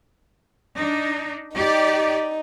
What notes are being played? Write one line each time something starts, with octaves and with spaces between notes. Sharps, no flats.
D4 D#4
D#4 G4 D5